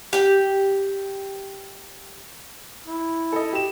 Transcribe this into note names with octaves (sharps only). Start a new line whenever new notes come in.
G4 G5
E4
A4 D#5
G4 E7